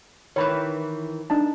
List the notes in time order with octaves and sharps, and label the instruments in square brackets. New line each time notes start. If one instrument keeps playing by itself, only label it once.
[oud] D#3 E3 B4 [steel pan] C#5 B5
[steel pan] D4 D#4 A5